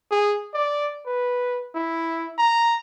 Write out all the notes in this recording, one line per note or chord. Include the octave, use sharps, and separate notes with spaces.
G#4
D5
B4
E4
A#5